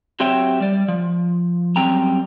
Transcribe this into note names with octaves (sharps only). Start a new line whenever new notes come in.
F#3 C4 G4 C#5 E5 G5
G3 D5
F3
F#2 G3 C4 G5 A#5